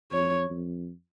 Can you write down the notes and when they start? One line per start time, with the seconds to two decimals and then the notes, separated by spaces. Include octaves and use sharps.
0.12 F2 C#5
0.50 F2